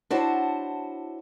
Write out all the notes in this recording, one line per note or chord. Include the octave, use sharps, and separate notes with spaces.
D4 E4 F#4 C5 C#5 A5